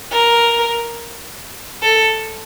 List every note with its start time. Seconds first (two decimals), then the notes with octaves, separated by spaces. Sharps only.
0.12 A#4
1.82 A4